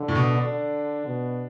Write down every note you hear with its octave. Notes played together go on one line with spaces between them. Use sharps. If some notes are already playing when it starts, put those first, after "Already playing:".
Already playing: D3
A2
B2
D3 D4
B2